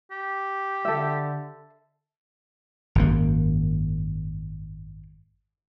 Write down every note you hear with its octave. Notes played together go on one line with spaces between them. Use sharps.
G4
D3 A4 E5
G#1 F#2 A#3